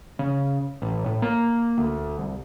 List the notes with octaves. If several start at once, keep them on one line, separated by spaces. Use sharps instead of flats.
C#3
A1
A2
A#3
D2
C2